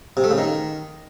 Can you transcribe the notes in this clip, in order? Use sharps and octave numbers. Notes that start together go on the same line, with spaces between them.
C3
A3
C#3
D#3